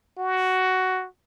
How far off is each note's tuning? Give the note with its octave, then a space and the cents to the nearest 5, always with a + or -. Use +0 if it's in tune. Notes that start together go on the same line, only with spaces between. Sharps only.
F#4 +10